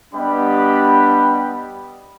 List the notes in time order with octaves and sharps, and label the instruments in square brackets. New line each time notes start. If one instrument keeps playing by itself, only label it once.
[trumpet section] G3 B3 D4 G4 D#5 B5